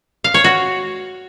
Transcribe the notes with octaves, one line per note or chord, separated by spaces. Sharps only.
F5
C#5
F#4